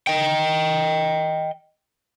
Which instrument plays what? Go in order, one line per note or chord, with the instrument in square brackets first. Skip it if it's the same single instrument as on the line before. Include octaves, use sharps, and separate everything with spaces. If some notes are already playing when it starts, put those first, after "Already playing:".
[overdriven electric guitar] D#5 G5